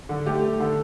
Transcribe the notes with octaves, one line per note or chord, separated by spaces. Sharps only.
D3
A3 G4
A3
D3 A4